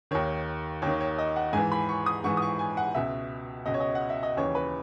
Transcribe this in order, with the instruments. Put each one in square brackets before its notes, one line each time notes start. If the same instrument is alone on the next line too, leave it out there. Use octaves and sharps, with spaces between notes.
[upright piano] D#2 D#3 C#5
D#2 D#3 C#5
C#5
D#5
F#5
G#2 E3 G#5
B5
C#6
D#6
G#2 E3 C#6
D#6
C#6
G#5
F#5
C#2 B2 E5
C#2 B2 D#5
C#5
D#5
F#5
E5
D#5
D#2 C#3 E3 C#5
B4